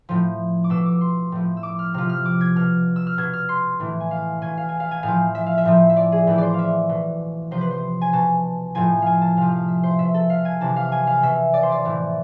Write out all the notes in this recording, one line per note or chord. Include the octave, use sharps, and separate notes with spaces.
A2 F3
D6
B2 E6
D6
C6
A2 F3
E6
D6
F6
C3 F3 F6
F6
D6
G#6
B2 F6
E6
F6
B2 G#6
F6
C6
A2 E3
G#5
F5
B2 G#5
F5
G#5
F5
G#5
A2 F3 F5
E5
F5
E5
A2 F3
E5
D5
G#4
A2 E3 B4
C5 D5
E5 F5
B2
C3 F3 C5
B4
C5
G#5
B2 A5
A2 F3 G#5
F5 G#5
A5
C3 F3 F5
F5
E5
C5
B2 E5
A4
F5
G#5
C3 E3 A5
F5
G#5
F5
B2 E5
D5
C5
D5
A2 E3